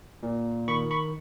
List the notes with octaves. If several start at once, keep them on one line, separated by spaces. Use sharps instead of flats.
A#2
D#3 B5 C#6
B5 C#6